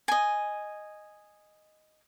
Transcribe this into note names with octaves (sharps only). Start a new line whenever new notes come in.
D#5 G#5